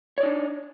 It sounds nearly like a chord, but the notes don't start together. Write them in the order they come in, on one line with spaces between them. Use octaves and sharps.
C#5 D5 D#4 D4